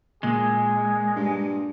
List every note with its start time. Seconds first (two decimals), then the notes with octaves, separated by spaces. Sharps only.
0.23 A#2 G#3 G#4
1.16 G2